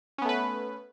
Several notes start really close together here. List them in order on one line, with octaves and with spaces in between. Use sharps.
C#4 B3 A3 B4